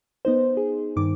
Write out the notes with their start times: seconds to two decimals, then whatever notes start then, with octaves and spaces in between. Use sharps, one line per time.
0.25 B3 D#4 C5
0.57 G#4
0.96 G2 D#3 D6